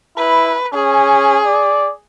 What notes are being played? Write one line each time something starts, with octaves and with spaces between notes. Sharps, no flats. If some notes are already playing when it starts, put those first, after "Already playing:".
E4 B4
C#4 G#4
D5